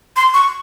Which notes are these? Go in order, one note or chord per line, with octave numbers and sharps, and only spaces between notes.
C6
C#6